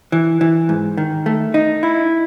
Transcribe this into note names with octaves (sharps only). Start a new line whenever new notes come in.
E3
E3
G#2
D#3
A3
D#4
E4